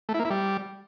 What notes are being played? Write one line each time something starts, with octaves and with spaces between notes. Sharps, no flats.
A3
E4
A#3
E4
G3